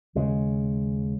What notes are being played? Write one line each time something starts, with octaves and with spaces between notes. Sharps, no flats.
D#2 C#3 G#3